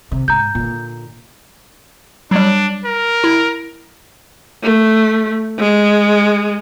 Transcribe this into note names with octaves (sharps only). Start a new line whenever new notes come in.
C3
G#2 A#5 G6
A#2 D3
F#3 G3 D4
A#4
E4
A3
G#3